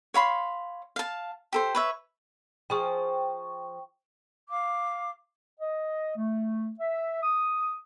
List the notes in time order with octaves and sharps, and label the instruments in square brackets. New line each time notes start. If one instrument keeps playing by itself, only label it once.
[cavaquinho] C#5 F5 B5 C6
F5 A5
G4 A4 C5
B4 C#5 E5
[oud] F3 G#4 [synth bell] G5 C#6
[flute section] F5 D6
[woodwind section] D#5
A3
E5
D#6